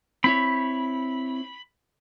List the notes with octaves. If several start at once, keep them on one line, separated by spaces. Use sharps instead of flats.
C4 E4 C#5 B5